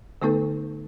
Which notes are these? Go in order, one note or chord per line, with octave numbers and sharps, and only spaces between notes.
D3 A3 B3 D#4 A4 B4